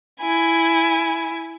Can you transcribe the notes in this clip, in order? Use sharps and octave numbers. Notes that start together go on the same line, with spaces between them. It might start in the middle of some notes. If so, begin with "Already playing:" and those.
E4 G#5